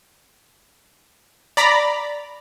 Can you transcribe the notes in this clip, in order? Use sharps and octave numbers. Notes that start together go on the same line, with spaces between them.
D5 A#5 B5